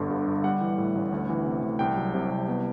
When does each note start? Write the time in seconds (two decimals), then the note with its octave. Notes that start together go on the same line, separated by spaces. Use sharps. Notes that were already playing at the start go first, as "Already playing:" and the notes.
Already playing: G1 G2 D3
0.10 G2
0.27 G1
0.44 G3 F#5
0.61 E3
0.78 A2
0.95 A1
1.12 D2
1.30 E3
1.46 C3
1.63 D2
1.79 C2 G5
1.97 F#3
2.14 C3
2.30 C2
2.48 B3